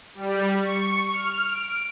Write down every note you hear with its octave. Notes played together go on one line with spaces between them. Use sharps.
G3
C#6
F6
D7